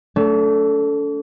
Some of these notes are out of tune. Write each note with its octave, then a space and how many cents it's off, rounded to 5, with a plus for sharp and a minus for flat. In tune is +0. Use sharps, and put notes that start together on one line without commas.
A3 +0 D4 -45